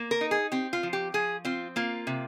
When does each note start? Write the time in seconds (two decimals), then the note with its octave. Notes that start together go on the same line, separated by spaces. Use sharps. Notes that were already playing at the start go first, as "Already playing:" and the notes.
Already playing: A#3
0.11 A#4
0.21 D#4
0.31 G#4
0.52 C4 G4
0.73 F4
0.83 F3
0.93 G4
1.14 F3 G#4
1.45 C4 F4
1.76 A#3 F4
2.07 C3